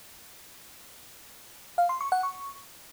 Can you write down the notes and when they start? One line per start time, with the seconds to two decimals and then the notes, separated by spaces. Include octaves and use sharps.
1.78 F5
1.89 C6
2.01 C#6
2.12 F#5
2.23 C#6